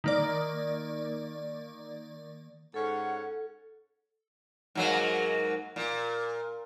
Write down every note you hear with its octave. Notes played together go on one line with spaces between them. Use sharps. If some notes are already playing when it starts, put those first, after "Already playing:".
D#3 A#3 D5
G#2 C#4 A4 C#5 F#5
G#2 F#3 A#3
A#2